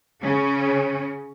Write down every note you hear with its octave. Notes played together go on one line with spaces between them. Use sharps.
C#3 C#4